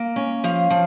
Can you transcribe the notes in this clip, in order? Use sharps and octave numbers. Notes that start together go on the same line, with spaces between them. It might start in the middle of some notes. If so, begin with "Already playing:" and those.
Already playing: A#3
C#4
F3 F5
F3